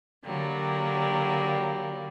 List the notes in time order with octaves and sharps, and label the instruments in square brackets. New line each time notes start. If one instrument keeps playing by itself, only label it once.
[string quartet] D3 F#3 G3 A#3